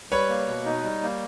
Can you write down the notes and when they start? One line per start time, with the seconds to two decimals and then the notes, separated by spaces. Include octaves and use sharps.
0.11 G3 B4 C#5
0.29 A#3
0.47 B2
0.65 D#4
0.84 G3
1.03 A#3